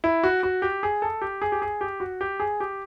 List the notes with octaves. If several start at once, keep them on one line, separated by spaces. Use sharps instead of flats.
E4
F#4
F#4
G4
G#4
A4
G4
G#4
G4
G#4
G4
F#4
G4
G#4
G4